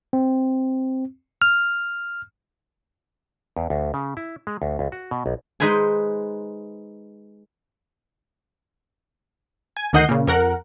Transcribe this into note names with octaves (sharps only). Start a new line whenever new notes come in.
C4
F6
E2
D2
C#3
E4
G#3
D2
C#2
F#4
B2
B1
G#3 D#4 B4 C5 G#5
G#5
D2 D#3 D#5 F#5 G6 C7
A#2 C#3
F2 A#4 F#5